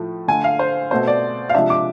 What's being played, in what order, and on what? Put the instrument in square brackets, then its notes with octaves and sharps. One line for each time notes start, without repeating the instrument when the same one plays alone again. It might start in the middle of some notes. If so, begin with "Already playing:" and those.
Already playing: [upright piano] A2 F3 A3
D3 A3 D4 G#5
F5
C5
B2 A3 C4 C5
D5
F5
C3 F3 G#3 D4 E5
D6